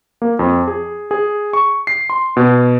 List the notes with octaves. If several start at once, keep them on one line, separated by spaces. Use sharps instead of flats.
A#3
F2
G#4
G#4
C#6
C7
C6
B2